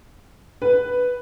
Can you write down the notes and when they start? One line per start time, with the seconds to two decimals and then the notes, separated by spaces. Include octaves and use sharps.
0.62 B4